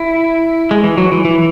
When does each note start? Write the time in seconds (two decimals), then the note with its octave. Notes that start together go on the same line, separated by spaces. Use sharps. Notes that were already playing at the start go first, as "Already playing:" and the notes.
Already playing: E4
0.71 G#3
0.84 E3
0.97 F#3
1.12 E3
1.25 E3